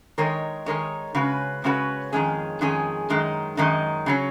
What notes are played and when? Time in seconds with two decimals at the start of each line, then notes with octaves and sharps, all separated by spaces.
0.18 D#3 G#3 D#4 A#4 C#5
0.66 D#3 G#3 D#4 A#4 C#5
1.15 C#3 G#3 C#4 F#4 B4
1.64 C#3 G#3 C#4 F#4 B4
2.12 F2 D#3 G#3 C#4 G#4
2.61 F2 D#3 G#3 C#4 G#4
3.10 F#2 D#3 G#3 D#4
3.57 F#2 D#3 G#3 D#4
4.06 C#3 F#3 C#4